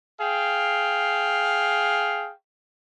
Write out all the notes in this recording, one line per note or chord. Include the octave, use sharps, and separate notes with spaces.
G#4 F5 G5